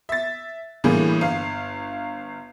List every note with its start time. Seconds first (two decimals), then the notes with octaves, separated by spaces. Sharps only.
0.09 E5 A6
0.84 A2 D3 E3 G3 A#3 G#4
1.21 G1 F5